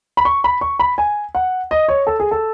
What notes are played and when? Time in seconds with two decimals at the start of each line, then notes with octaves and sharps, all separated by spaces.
0.17 B5
0.25 C#6
0.44 B5
0.61 C#6
0.79 B5
0.98 G#5
1.35 F#5
1.71 D#5
1.88 C#5
2.07 A4
2.20 G#4
2.31 A4